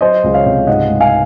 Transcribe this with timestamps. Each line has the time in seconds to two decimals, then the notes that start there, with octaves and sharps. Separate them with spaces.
0.01 F#3 C5 D#5
0.24 C#2
0.34 C#5 F5
0.46 C3
0.67 G#2 D#5 F#5
0.90 G#2
1.01 F5 G#5